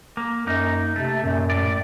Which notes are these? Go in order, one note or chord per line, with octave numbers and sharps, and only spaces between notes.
A#3
F#2 A#3 D#4
C3 A3
F#2 A#2
A2 D5